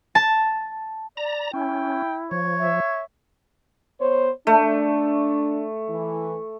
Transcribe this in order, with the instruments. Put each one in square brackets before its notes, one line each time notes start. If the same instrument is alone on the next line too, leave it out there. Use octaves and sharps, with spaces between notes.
[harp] A5
[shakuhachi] D5 [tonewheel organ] A#5
[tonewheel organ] C#4 [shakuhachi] E4 [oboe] G5
[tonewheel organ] F3 [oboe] C#5
[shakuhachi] E5
[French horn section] B3 C5 C#5
[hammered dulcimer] A3 [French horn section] D4
[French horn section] E3